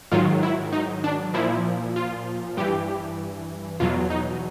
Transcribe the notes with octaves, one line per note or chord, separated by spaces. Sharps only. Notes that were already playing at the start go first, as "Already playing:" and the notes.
G#2 D#3 F#3 F4
E4
D#4
D4
A#2 F3 E4
F4
G2 E3 G4
E2 B2 F#3 F4
D#4